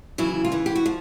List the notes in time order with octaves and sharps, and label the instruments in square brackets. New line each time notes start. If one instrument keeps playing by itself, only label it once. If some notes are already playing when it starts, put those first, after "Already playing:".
[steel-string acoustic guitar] D#2 C#3 E3 F#3 E4
F4
E3 E4
G4
F#4
F3